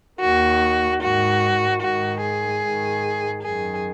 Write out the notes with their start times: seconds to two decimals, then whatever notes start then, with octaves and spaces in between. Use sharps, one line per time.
0.21 D#2 D#3 F#4
1.01 G#2 D#3 F#4
1.81 G#2 D#3 F#4
2.22 G#4
2.62 G#2 D#3
3.42 F#2 D#3 G#4